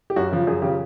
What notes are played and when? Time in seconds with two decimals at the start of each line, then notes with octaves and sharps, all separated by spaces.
0.10 G4
0.16 F#2 F#4
0.32 C#3 F3
0.47 F#2 G#4
0.62 C#3 F3 G4